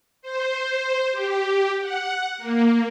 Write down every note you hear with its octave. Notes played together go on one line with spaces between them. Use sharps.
C5
G4
F#5
A#3